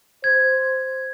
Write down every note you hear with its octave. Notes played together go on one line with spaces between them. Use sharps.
C5 G#6